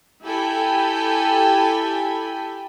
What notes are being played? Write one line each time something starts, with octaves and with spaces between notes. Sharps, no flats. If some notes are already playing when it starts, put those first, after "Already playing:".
E4 G4 A4 G5 G#5 B5